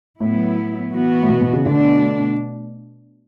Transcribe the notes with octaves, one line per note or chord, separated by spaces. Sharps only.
A2 F#3 B3 E4
E3 B3 F#4
A2
B2
B2
C#3
B2 D3 A3 D4